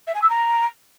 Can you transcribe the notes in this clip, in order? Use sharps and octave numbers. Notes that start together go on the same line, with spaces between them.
E5
G#5
E6
A#5